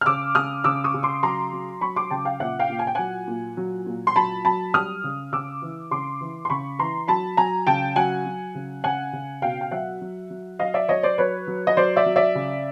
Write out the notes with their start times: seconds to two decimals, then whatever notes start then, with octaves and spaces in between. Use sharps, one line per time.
0.01 F6
0.06 C#3 D6 E6
0.35 C#3 D#6 F6
0.64 C#3 D6 E6
0.84 C#6 D#6
0.94 C#3
1.03 C6 D6
1.23 F#3 A#5 C6
1.53 F#3
1.81 F#3 B5 C#6
1.96 C6 D6
2.10 C#3 G5 A5
2.25 F5 G5
2.40 A#2 E5 F#5
2.59 F5 G5
2.69 A#2
2.79 G#5
2.87 G5
2.95 F#3 F#5 G#5
3.27 A#2
3.57 F#3
3.86 A#2
4.07 C6
4.16 F#3 A5 B5
4.45 F#3 A5 B5
4.74 G3 D#6 F6
5.04 C#3
5.32 C#3 D6 E6
5.62 E3
5.91 C#3 C6 D6
6.21 E3
6.45 C6
6.50 C#3 B5 C#6
6.79 E3 A#5 C6
7.08 F#3 A5 B5
7.37 F#3 G#5 A#5
7.67 C#3 G5 A5
7.96 F#3 F#5 G#5
8.26 F#3
8.55 C#3
8.84 C#3 F#5 G#5
9.13 C#3
9.42 B2 F5 G5
9.61 G5
9.71 F#3 E5 F#5
10.01 F#3
10.30 F#3
10.59 F#3 D#5 F5
10.74 D5 E5
10.88 F#3 C#5 D#5
11.03 C5 D5
11.18 F#3 B4 C#5
11.47 F#3
11.67 D#5
11.77 F#3 C5 D5
11.96 D5 E5
12.06 F#3
12.16 D5 E5
12.35 C#3